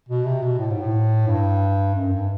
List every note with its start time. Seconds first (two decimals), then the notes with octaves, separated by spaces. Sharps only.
0.09 B2
0.25 C3
0.42 B2
0.59 A2
0.70 G#2
0.81 A2
1.27 G2
1.95 F#2
2.12 G2